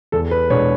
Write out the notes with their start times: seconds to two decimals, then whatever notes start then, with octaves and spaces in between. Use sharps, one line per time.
0.12 E2 A4
0.31 B4
0.50 B2 G#3 D4 C#5